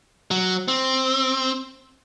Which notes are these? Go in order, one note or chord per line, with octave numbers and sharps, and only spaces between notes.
F#3
C4